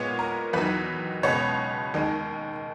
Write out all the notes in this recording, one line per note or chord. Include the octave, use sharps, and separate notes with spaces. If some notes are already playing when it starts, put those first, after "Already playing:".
Already playing: A#2 G#3 B3 C#5
A#4
E2 D#3 F#3 B4
C#2 B2 G#3 B3 C#5
D#2 D#3 G#3